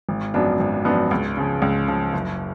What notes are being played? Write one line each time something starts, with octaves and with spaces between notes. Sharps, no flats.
G#1
F#2 F3 B3 D4
G#1
F#2 F3 B3 D4
C#2
C#3 F3
C#2
C#3 F3
F#1